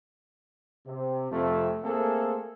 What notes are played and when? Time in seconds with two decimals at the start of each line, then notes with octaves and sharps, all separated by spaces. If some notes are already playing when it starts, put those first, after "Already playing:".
0.86 C3
1.31 F2 C3 A3
1.83 A3 A#3 C4 G#4 A4